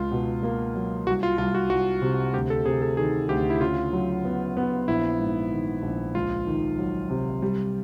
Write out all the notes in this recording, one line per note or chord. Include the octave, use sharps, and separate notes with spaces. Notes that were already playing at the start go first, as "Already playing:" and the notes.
Already playing: C#2 F4
B2
A#3
F#3
C2 F#4
F4
C2 F4
F#4
C2 F#4
C3
D2 G4
A4
C3 G#4
A4
D#3 G#4
D2 G4
E4
C#3 F4
F#3
B3
B3
A#1 E4
G#2
D#3
A#1
C#2 F4
D#3
F#3
C3
G3